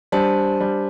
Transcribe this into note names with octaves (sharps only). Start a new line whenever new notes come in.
G3 D4 C5 A5
G3